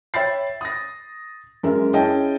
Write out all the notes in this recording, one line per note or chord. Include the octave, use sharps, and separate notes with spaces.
C#5 E5 G5 B5 A6 C7
D#6 A#6
F#2 G#3 A#4 E5
C#4 E4 G#4 D#5 G5 A5